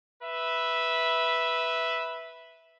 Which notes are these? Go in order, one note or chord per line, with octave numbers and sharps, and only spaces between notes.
B4 E5